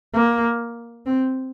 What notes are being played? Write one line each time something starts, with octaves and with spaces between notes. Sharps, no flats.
A#3
C4